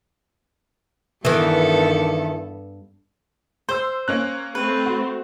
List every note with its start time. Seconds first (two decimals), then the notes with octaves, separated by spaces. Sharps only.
1.25 G2 D#3 E3 B3 A4
3.69 C5 C6 E6
4.08 A#3 C#4 F#6
4.55 A3 C4 B4
4.86 F#4